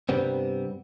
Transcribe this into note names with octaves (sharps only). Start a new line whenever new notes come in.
G2 C3 G3 B3 C4